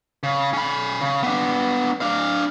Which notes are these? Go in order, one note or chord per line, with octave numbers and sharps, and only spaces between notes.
C#3
C#4 B5
C#3
B3 D4
D4 F5